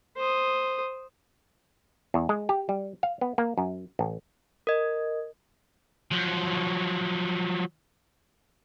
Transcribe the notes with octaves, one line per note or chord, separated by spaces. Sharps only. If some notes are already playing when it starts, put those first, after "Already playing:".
C5 D#6
E2
G#3
G4
G3
F5
B3
A#3
F#2
A1
A#4 D#5
F3 F#3